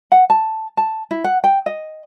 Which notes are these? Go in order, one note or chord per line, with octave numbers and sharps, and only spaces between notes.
F#5
A5
A5
E4
F#5
G5
D#5